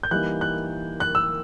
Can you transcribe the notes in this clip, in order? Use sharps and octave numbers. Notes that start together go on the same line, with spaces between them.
G6
E3 G3 A#3 D#4 F#6
F#6
F#6
E6